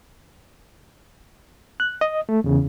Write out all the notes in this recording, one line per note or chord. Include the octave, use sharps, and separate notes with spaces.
F#6
D#5
A3
E2 C#3